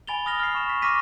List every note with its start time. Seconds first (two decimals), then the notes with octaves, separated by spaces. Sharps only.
0.07 G#5 B5 A6 F7 G7
0.26 D#6 F6 A#6 F7 G7
0.40 F6 C7
0.55 C#6 E7
0.70 B6
0.82 C#6 D6 F6 A#6 B6 D#7